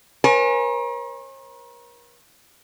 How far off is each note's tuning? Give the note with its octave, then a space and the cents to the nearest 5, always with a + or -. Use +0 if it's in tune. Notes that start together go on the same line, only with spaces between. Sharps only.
A#4 +40 C#5 -45 G#5 +0